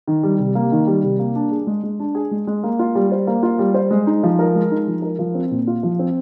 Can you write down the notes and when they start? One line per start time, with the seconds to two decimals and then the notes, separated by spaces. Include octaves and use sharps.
0.07 D#3
0.23 G3
0.39 C3
0.55 A#3
0.72 D#3
0.87 G3
1.03 C3
1.19 A#3
1.35 D4
1.51 G#4
1.67 G#3
1.83 G#3
2.00 D4
2.15 G#4
2.31 G#3
2.47 G#3
2.64 A#3
2.79 F4
2.95 G3
3.12 C5
3.27 A#3
3.43 F4
3.59 G3
3.74 C5
3.91 G#3
4.07 D#4
4.23 F3
4.39 A#4
4.55 G#3
4.71 D#4
4.87 F3
5.02 A#4
5.19 F3
5.35 C4
5.51 A#2
5.67 F4
5.83 F3
5.99 C4